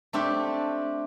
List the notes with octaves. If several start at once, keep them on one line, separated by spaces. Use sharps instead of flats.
A3 C4 D4 G4